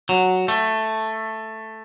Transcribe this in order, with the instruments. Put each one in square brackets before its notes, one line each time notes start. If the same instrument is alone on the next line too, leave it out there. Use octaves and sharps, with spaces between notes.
[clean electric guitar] F#3
A3